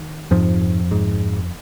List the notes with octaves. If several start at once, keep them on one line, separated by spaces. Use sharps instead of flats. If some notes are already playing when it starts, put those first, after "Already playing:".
Already playing: D#3
F2 G#2 F3
G#2